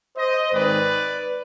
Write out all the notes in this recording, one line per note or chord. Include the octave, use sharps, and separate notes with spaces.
C5 D#5
G#2 D#3 G#3 C4 D#4 B4 D5